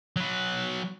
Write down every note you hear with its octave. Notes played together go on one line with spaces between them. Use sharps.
F#3 B4